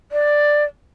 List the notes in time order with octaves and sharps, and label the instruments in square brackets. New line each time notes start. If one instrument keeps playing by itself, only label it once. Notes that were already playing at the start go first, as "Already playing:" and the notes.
[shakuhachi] D5